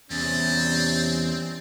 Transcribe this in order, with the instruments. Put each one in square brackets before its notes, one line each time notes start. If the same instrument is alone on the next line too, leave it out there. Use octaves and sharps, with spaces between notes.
[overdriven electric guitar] E2 [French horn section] C3 G3 C#4 [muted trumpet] C4 [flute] A6